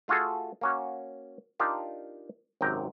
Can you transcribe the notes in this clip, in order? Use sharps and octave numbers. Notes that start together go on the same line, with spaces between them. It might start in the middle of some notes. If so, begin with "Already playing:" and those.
A3 F4 F#4 G#4 A4
A#3 C#4 F#4
D4 D#4 F4 G4 A#4
G#1 F#2 C3 G5 A#5